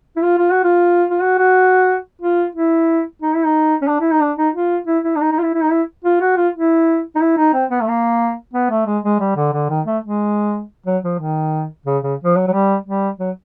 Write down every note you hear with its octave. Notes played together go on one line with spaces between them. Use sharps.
E4
F4
F4
F#4
F4
F4
F#4
F#4
F4
E4
D#4
E4
D#4
C#4
D4
E4
D#4
D4
D#4
F4
E4
E4
D4
D#4
D#4
F4
E4
E4
D#4
E4
F4
F#4
F4
E4
D#4
E4
D#4
C4
B3
A3
A#3
B3
A3
G#3
G#3
G3
D3
D3
D#3
A3
G#3
F#3
F3
D#3
C#3
C#3
F3
F#3
F#3
G3
G3
F#3